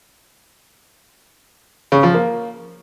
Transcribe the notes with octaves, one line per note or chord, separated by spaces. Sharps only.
C#3
F3
A#3